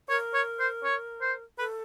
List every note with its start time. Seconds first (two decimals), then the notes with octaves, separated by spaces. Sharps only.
0.09 A#4 C#5
0.34 C#5
0.60 C5
0.84 C#5
1.21 C5
1.58 A4 B4